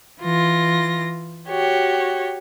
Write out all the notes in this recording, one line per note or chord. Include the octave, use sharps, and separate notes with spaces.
E3 F4 A#6
F#4 G4 C#5